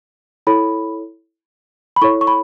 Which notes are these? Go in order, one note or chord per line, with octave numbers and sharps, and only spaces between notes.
E4 A4 C#5 B5
B5
E4 A4 C#5 C#6
C#6
B5